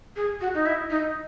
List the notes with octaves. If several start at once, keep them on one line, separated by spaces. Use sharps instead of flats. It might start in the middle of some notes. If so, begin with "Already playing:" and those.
G#4
F#4
D#4
E4
D#4